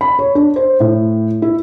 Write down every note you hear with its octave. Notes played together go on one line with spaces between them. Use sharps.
B5
C#5
D4
C5
A2
E4